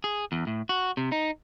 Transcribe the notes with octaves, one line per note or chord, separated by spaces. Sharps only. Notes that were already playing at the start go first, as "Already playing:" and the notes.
G#4
E2
A2
F#4
C3
D#4